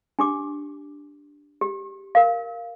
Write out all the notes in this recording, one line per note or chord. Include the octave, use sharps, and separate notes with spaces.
D4 G4 D6
G4
A#4 F5